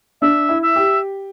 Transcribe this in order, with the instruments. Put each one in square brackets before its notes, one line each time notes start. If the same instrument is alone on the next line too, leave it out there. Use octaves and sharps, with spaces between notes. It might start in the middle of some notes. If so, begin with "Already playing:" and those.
[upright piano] D4 [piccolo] E5
[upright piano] E4
[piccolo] E5
[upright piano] G4